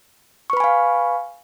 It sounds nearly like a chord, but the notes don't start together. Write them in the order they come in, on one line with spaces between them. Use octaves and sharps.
C#6 B4 B5 G#5 F5